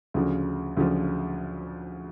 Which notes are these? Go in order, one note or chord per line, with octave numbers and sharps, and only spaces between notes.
D2 C#3 F3
D2 C#3 F3